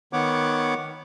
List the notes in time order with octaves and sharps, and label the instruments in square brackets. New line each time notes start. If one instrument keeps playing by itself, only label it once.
[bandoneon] D#3 B3 C#5 F#5 D6